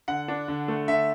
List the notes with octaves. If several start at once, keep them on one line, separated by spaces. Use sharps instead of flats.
D3 F#5
D4
D3
A3
D3 E5